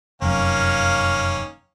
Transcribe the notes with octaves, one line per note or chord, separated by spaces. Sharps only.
F1 F#2 D#3 A#3 C#4 F5